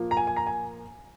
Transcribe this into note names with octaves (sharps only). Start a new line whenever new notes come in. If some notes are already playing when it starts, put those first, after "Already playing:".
Already playing: A#2 F3 A#3
A#5
G#5
G#5
A#5
G#5